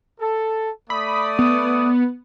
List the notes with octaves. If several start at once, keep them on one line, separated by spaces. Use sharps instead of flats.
A4
A3 D5 B5 D#6
B3